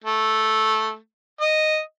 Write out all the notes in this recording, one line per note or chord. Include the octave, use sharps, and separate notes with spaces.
A3
D#5